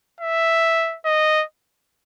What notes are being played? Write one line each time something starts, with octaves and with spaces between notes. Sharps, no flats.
E5
D#5